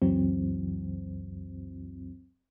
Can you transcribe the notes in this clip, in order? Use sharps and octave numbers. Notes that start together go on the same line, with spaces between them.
C#2 F#2 E3 F#3 C4